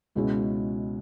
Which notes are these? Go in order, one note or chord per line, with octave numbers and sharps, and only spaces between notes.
C#2 B2 G#3 C#4 E4